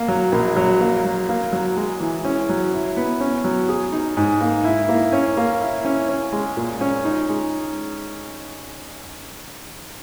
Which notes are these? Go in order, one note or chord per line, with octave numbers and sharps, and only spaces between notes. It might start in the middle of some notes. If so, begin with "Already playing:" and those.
Already playing: A#3
F#3
A#1
F#3
A#3
F#3
A#3
F#3
G#3
E3
C#4
F#3
E4
B3
C#4
F#3
G#4
D#4
G#2
A#3
E4
A#3
C#4
A#3
E4
C#4
C#4
G#3
A#2
C#4
D#4
G#3